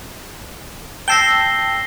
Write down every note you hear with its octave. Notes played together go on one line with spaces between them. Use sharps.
G5 A5 E6 A#6 C7 G7